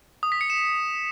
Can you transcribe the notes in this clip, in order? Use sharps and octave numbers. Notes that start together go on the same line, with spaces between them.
D#6
B6
C#7
E7